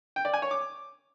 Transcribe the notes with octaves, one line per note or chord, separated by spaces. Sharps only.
G5
D5
G#5
C#5
D6